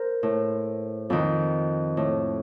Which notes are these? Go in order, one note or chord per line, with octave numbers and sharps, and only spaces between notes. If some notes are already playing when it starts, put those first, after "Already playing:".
Already playing: A#4 C5
A2
F2 D#3
A2